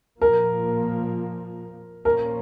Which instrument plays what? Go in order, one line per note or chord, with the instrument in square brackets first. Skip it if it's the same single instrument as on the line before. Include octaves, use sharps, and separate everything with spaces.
[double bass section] A#2 F3 A#3 [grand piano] A#4
[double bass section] A#2 F3 A#3 C#4 [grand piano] A#4